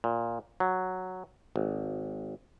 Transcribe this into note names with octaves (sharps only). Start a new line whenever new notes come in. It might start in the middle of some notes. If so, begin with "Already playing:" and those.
A#2
F#3
G#1